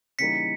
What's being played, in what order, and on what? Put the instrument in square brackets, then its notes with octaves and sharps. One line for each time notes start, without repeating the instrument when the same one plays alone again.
[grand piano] C#3 E3 G3 A#3 D#4 [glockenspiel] B6 C#7